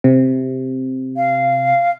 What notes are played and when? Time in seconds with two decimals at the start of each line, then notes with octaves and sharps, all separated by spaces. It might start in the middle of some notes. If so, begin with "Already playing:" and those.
0.04 C3
1.17 F5